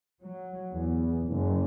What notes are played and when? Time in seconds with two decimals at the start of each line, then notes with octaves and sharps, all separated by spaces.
0.22 F#3
0.71 E2
1.27 F#1